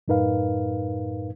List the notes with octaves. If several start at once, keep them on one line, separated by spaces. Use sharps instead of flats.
F#2 A2 D#4 A#4 B4 F5